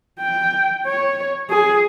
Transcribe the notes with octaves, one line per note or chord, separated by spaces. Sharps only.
G5
C#5
G#4